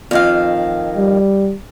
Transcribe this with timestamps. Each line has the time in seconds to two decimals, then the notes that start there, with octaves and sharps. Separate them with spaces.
0.11 F2 D#3 F5
0.97 G3